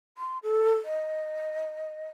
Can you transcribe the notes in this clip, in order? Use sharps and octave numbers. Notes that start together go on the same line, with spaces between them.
C6
A4
D#5